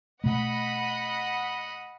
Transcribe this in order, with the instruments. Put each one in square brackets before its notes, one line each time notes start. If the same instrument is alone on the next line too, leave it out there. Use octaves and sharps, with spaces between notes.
[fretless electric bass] B2 A3 [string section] D#5 F#5 B5